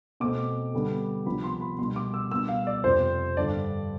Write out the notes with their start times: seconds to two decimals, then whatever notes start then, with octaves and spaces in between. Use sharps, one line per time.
0.20 B2 A3 C4 D6
0.74 D3 G3 B3 D4
1.26 C3 F3 B3 D4 B5
1.44 C6
1.61 B5
1.79 B2 G3 D4 C6
1.96 D6
2.14 E6
2.31 B2 G3 B3 D4 E6
2.48 F5
2.67 D5
2.84 F2 C3 F3 C5
3.37 G2 D3 G3 D4 D5